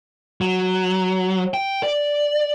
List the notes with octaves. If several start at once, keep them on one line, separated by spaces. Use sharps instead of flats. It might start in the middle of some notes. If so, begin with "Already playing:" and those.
F#3
G5
D5